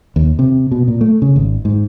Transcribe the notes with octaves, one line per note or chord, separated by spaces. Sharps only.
D#2
C3
B2
A#2
A3
C#3
G#1
G#2